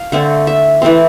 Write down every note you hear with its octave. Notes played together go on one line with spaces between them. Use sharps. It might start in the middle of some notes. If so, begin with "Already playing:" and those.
Already playing: F5
D3 A3 C4
E5
E3 A3 C4